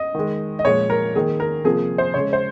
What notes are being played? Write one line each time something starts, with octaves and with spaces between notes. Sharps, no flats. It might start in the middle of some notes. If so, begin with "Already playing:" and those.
Already playing: D#5
D#3 G#3
D#5
A#2 F3 G#3 C#5
A#4
D#3 A#3 G#4
A#4
C3 F3 A#3 G#4
C5
C#3 G#3 C#5
C5